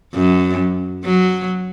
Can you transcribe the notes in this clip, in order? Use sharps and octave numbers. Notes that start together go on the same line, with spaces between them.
F#2
F#3